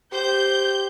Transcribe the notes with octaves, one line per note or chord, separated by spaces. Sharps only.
G4 C5 G6